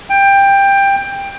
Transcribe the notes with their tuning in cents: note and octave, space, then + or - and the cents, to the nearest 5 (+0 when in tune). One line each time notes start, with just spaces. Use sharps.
G5 +15